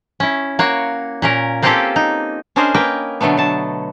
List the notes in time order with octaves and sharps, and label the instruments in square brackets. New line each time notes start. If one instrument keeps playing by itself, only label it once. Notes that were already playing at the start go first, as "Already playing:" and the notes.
[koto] C#4 E4
A#3 F#4 C#5
A#2 C#4 A#4
A#3 C4 C#4 F4 G4 A4
D#4
C#4 D4 G#4 A#4 C5 D#5
A#3 A#4 B4 D#5 G5 A#5
B2 D3 F#3 A3 B3
D3 A5